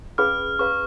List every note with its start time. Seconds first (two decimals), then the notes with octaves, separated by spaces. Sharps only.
0.18 C#4 G#4 B4 F5 B5 F6
0.59 C#4 G#4 B4 F5 B5 C#6